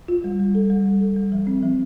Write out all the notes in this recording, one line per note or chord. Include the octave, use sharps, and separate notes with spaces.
F4
G3
G3
A4
G3
G3
A4
G3
F3
C4
F3